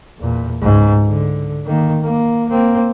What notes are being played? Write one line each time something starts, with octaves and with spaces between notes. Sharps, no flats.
E2 A#2
C#2 G#2
D3
D#3 A#3
A#3
A#3 C4